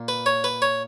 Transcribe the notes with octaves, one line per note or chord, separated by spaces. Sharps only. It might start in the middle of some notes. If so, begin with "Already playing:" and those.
Already playing: A#2
B4
C#5
B4
C#5